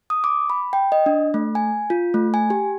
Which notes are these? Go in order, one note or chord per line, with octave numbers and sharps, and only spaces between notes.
D#6
D6
B5
G5
D#5
D4
A3
G#5
F4
A3
G#5
G4